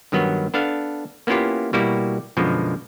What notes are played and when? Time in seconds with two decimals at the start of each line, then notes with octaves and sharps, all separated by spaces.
0.12 G2 D#3 F#3 B3
0.54 B3 D4 A4 F5
1.27 A#3 B3 C#4 E4 F4 G4
1.73 B2 G3 A#3 E4 F#4 G4
2.37 F#2 B2 D3 F3 G#3